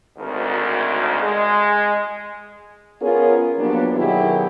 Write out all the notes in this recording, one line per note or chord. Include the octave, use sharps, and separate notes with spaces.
G#1 D2
G#3
B3 C#4 F4 G#4 A#4
F3 F#3 A#3 B3 D4 G4
B2 D#3 F#3 E4 G4 G#4